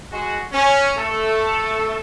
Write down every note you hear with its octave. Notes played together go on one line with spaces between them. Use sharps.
G#3 F#4
C#4
A3 A4